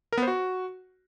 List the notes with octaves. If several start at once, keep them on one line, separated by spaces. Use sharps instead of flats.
A#4
B3
C5
F#4